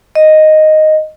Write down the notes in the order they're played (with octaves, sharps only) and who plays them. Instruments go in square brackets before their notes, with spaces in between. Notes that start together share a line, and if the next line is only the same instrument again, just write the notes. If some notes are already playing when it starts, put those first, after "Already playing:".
[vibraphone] D#5